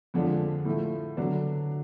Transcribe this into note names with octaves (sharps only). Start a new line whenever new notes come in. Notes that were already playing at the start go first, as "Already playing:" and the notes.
F2 D3 F3 G#3 D4
A2 F3 A3
D3 F#3 B3 D4